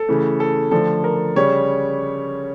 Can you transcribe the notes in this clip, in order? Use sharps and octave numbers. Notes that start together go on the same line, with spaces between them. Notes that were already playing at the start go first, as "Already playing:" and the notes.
Already playing: A4
C#3 E3 A3
A4
D3 F3 A3 A4
A#4
C#3 G3 C#5